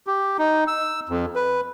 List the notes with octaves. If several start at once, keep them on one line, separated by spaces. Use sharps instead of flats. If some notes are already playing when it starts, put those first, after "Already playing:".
G4
D#4
E6
F2
B4